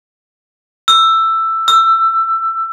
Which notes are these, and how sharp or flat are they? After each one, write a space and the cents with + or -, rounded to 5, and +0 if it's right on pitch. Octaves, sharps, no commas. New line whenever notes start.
E6 +10
E6 +20